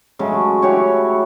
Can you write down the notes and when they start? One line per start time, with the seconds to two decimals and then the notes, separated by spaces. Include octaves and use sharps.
0.19 C#3 F#3 G#3 A3
0.62 E4 F#4 G4 C#5